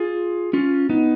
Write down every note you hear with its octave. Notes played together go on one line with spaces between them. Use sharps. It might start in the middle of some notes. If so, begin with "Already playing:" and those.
Already playing: F4 G#4
C#4 F4
B3 D#4